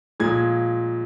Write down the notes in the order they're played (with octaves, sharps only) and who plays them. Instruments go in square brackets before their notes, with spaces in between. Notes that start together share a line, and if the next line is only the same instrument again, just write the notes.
[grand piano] A#2 F3 G#3 G#6